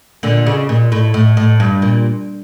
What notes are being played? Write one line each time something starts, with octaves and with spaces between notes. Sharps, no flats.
A#2 D3
C#3
A#2
A2
A2
A2
G2
A#2